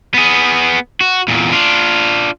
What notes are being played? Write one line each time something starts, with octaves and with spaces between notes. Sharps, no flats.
B3 G#4
F#4
E2 A#2
D4 F4